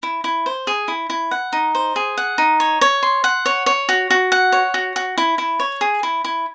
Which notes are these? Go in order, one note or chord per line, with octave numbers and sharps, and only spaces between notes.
E4
E4
C5
G#4
E4
E4
F#5
D#4
C5
G#4
F#5
D#4
C#5
C#5
C6
F#5
C#5
C#5
F#4
F#4
F#5
C#5
F#4
F#4
E4
E4
C#5
G#4
E4
E4